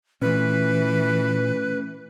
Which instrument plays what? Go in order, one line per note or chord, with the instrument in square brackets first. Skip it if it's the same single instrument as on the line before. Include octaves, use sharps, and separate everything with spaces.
[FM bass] A#2 [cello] E3 [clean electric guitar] A3 C#4 [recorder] B4